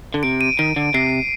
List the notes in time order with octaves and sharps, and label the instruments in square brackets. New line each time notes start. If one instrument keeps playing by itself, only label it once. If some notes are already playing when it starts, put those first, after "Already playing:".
[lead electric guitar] D3
[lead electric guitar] C3 [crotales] D7
[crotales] D#7
[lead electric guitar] D#3 [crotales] D7
[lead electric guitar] D3
[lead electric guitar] C3 [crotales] C7